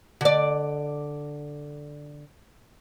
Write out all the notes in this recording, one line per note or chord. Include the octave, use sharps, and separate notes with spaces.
D3 D5